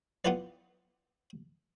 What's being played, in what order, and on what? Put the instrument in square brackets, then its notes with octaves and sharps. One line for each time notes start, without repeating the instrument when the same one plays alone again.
[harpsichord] B3 E4 F4 G4 B4 D5